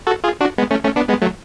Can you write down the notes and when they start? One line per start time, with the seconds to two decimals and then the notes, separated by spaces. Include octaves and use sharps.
0.07 F#4 A4
0.24 F4 G#4
0.40 D4 F#4
0.58 G#3 B3
0.71 A3 C#4
0.83 A3 C#4
0.96 B3 D4
1.09 G#3 B3
1.22 F#3 A3